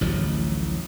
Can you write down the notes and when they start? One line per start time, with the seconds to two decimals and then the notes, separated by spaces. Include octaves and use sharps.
0.01 A1 D2 F3 F#3